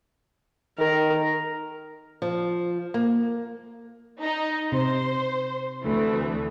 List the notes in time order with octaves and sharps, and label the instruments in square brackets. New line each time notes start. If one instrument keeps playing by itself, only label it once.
[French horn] D#3 [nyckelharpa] A#4
[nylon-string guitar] F3
A#3
[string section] D#4
[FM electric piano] C3 [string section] C5
[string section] D2 E3 A3